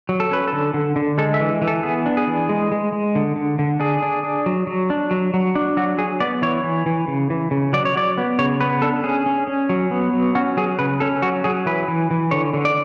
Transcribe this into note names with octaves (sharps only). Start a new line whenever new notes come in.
F#3
A4
C#4 B4
A4
D3
D3
D3
G#3 A4
E5
E3
E3
A4
B3 G#4
D4
G#4
E3
G#3
G#3
G#3
D3
D3
D3
D4 G#4
D4
D4
F#3
F#3
D4
F#3
F#3
D4
F#3 F#4
F#3 G#4
B3 D5
E3 C#5
E3
E3
C#3
E3
C#3
F#3 D5
C#5
F#3 D5
B3
C#3 C#5
B3 B4
D4 A4
C#4 G#4
C#4
C#4
F#3
B3
F#3
C#4 F#4
F#3 G#4
C#3 B4
C#4 A4
F#3 F#4
F#3 G#4
E3 B4
E3
E3
D3 C#5
D3
D5